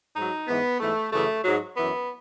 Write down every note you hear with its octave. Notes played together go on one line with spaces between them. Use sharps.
G#2 F#3 D#4
G#2 E3 B3
G#2 E3 A3
F#2 C#3 E3 A3
G#2 F#3
F#2 E3 B3